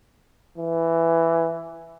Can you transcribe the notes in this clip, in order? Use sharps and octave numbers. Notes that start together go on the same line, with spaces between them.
E3